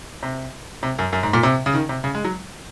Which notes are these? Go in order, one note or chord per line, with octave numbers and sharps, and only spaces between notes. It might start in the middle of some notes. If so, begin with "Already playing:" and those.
C3
C3
F#2
F#2
G#2
A#2
C3
C#3
D#3
C3
C#3
G#3
F#3